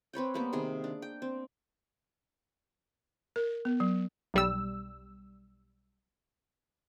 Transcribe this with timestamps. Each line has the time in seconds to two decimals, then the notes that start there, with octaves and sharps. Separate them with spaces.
0.13 C4 B4 C#5 G5
0.34 G3 A#3 B3
0.53 C3 D#3 G#4
0.84 D4
1.02 G5
1.22 C4
3.36 A#4
3.65 B3
3.80 F#3
4.34 B1 G3 E6